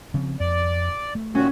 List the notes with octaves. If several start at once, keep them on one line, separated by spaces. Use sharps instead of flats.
C#3 F3 C4
F2 D5
A3
A#2 D#3 C#4 F#4